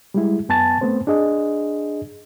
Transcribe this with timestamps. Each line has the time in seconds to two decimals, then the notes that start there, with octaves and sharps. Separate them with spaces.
0.14 G3 G#3 E4
0.49 F#2 B3 G#5 A5 A6
0.81 A3 B3 C4 C5
1.07 D4 G#4 D#5